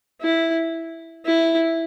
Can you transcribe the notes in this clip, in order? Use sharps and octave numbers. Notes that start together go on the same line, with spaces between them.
E4
E4